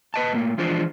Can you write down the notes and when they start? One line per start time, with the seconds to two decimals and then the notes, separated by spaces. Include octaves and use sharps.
0.14 B4 D#5 A5
0.33 A2 A#3
0.58 E3 F3 G#3 D4 F4 C5